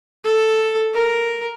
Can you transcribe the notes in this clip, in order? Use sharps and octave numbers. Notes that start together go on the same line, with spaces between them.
A4
A#4